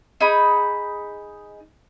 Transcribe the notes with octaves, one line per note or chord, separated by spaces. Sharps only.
D#4 G#4 B5